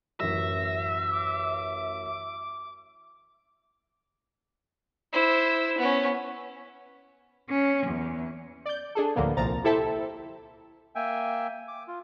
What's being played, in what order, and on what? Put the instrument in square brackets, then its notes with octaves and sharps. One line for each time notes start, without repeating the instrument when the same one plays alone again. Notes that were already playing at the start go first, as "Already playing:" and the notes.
[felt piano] A1 F#2 [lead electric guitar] E5 [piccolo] A#6
[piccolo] D6
[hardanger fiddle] E4 C5
B3 C#4
[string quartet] C#4
E2
[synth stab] D5 G6
D4 G#4 A4
D2 A2 D3 F3 A#3 B3
C2 A#2 F3 A#5 A6
E4 G4 A4 C5 E5 A5
[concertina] A#3 E5 G5 G#5
D6
F4